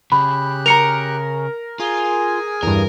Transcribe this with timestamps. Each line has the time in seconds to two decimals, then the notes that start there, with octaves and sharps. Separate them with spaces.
0.12 C#3 G4 B5 F#6
0.66 A#4 A#5 C#7 F7
1.80 F4 G#4 G#5
2.63 E2 G2 A#4